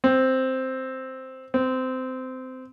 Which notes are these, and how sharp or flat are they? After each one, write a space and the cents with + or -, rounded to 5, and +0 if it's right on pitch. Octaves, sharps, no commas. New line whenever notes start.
C4 +0
C4 -20